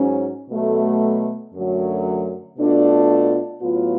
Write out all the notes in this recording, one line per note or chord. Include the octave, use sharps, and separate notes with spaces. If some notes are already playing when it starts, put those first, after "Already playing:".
Already playing: G#2 F#3 C#4
B2 F#3 A3
F#2 D3 F#3 A3
B2 A3 D4 F4
A2 F#3 B3 F4